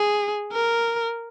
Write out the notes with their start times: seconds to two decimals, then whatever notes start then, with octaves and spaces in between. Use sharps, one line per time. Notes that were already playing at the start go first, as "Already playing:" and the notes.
Already playing: G#4
0.52 A#4